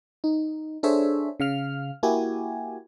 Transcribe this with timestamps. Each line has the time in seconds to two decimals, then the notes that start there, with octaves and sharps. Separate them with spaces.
0.24 D#4
0.83 D4 G#4 A4 C5 C#5 E5
1.40 C#3 F5 F6
2.03 A#3 E4 F#4 G4 G#5